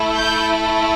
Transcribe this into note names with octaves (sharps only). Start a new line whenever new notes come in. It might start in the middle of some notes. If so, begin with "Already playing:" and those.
Already playing: A3 E4 A4
G6